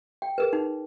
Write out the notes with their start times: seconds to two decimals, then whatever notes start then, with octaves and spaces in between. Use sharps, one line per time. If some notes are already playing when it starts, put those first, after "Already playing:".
0.22 G5
0.38 G#4 A#4 B4
0.53 D#4